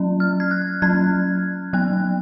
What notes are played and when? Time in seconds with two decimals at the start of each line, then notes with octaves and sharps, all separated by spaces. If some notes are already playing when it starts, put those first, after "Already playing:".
Already playing: F#3 C#4
0.20 F6
0.40 G#6
0.51 F#6
0.82 F#3 C#4 G#6
1.73 F#3 B3 F#6